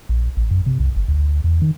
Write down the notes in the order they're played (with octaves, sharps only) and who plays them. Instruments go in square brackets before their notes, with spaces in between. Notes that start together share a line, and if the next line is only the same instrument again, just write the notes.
[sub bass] A#1
A1
F#2
C3
C2
G1
D2
E2
D#3